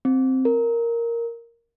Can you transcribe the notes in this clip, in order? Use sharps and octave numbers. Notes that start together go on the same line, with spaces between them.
C4
A#4